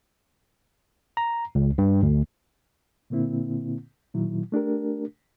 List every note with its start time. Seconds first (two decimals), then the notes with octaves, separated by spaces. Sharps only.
1.17 A#5
1.55 C#2
1.78 G2
2.03 D2
3.10 A#2 D3 A#3 C4 E4
4.14 A#2 D#3 F#3 E4
4.52 A3 D4 G4 A#4